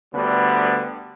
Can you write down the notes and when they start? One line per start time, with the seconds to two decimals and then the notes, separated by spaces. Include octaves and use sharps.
0.14 D2 D3 G3 B3 B4